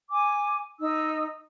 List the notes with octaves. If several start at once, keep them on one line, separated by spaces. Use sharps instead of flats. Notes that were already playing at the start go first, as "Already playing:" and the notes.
G#5 D6
D#4 E6